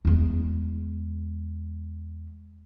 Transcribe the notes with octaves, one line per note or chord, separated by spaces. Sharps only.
E2 G#3